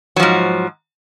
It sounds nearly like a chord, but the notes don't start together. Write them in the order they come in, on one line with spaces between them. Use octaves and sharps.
F#3 F3 G#2